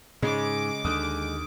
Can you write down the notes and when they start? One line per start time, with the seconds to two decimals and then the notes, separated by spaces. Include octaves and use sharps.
0.22 G#2 C#3 G#3 D6
0.85 D#2 D3 D#6